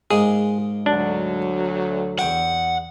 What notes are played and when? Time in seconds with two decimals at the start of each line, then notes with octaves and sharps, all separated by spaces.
0.11 G#2 G#3 A#3 G#4
0.86 D2 F#3 D4
2.19 E2 F#5 G5 C#6